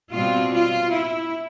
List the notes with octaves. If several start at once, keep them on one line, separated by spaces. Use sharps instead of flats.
B2 G3 C4 F4
F4
E4